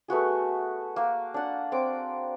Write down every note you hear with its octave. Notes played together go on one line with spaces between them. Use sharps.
A3 B3 F#4 G#4
A#3
D4 F#5
C4 D6